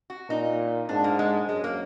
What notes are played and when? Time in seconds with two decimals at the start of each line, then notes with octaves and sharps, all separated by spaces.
0.10 F#4
0.29 A#2 D#4
0.89 G#2 D4
1.04 A#3
1.19 G#3
1.49 F#2 G#3
1.64 A#3